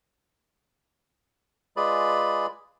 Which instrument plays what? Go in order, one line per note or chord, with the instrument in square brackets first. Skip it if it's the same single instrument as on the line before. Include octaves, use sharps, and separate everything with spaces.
[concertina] G#3 F4 G#4 B4 D5 B5